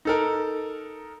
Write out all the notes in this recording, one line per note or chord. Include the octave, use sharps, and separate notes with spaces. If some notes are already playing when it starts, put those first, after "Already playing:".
D#4 A4 A#4